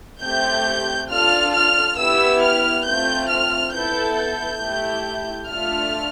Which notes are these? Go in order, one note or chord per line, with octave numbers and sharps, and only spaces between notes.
A3 C4 G4 G6
D4 F4 A4 F6
F6
B3 E4 G4 E6
F6
A3 C4 F4 G6
F6
B3 E4 A4 G6
G6
A3 E4 G4
A3 D4 F4 A4 F6